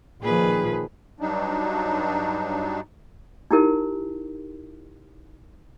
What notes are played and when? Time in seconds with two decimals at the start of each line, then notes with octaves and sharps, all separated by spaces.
0.23 A#2 D#3 F3 G#4 B4
1.20 G2 F#3 G3 D4 D#4
3.51 D#4 E4 G4 A#4